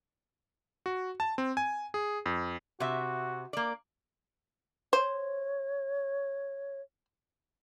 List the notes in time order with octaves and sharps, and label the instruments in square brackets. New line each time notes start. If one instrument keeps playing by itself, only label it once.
[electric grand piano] F#4
A5
C4
G#5
G#4
F2
[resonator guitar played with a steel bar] C3 E5 [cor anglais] F#4
[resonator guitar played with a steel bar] A#3 D5
[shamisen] C5 [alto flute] C#5